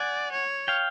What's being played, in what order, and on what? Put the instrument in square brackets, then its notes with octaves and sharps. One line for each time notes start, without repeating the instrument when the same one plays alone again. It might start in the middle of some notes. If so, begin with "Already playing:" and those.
Already playing: [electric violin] D5 [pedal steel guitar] F#5 G#5
[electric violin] C#5
[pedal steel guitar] F5 G5